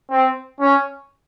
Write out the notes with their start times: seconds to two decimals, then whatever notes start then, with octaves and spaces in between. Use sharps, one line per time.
0.11 C4
0.60 C#4